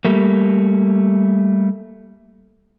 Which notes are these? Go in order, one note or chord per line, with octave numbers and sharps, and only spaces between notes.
G3 A3 A#3